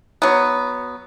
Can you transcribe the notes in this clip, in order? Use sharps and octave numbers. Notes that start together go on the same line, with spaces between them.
F#3 B3